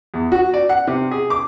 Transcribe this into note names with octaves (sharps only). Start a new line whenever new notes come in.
E2
F#4
D5
F#5
C3
G#4
D6